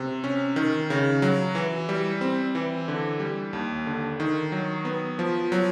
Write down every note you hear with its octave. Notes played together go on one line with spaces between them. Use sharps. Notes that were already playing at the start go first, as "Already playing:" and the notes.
Already playing: C3
C#4
D#3
C#3
F#3
E3
G3
C4
E3
D3
G3
D#2
D3
D#3
F#3
B3
F3
F#3